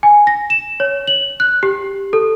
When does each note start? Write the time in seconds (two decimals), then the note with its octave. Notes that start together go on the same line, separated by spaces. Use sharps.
0.03 G#5
0.27 A#6
0.50 E7
0.80 C#5
1.07 F#7
1.40 F#6
1.63 G4
2.13 A4